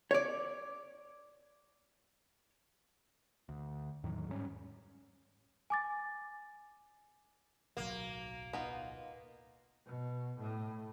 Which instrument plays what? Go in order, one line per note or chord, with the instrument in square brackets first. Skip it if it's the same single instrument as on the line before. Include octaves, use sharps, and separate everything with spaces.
[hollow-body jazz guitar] C#5 D5
[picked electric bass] D2
E2 A2 D#3 F#3
G#2 G3 G#3 C#4
[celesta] G#5 D6 A6
[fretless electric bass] D1 B1 F#3 [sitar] A#3
[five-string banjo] B3 D#4 F4
[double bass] B2
A2